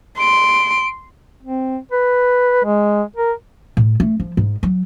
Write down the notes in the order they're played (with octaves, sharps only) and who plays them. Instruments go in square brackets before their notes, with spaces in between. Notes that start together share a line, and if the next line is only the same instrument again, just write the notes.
[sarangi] C6 [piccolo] D7
[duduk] C4
B4
G#3
A#4
[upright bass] A2
A3
F3
G#2
F#3